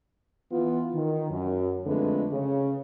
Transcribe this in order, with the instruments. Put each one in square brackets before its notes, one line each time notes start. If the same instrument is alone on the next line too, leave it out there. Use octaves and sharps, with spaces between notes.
[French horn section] E3 B3 F4
D#3
F#2
F2 D3 G#3 A3 B4
C#3